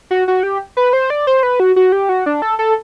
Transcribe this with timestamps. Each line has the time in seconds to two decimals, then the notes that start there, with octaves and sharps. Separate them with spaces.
0.11 F#4
0.28 F#4
0.43 G4
0.77 B4
0.93 C5
1.10 D5
1.27 C5
1.43 B4
1.60 F#4
1.76 F#4
1.92 G4
2.09 F#4
2.26 D4
2.42 A4
2.59 A4